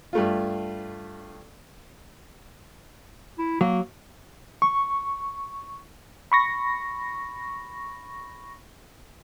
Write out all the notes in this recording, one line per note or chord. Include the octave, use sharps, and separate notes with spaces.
G2 A3 F4
E4
F#3 A#3
C#6
B5 C#6 A#6